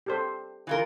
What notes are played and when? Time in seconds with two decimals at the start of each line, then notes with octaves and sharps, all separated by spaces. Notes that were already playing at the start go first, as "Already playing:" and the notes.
0.06 G4 A4 C5
0.67 E3 F4 A#4